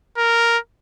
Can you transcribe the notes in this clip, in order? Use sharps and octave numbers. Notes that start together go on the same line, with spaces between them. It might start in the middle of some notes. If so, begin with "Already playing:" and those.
A#4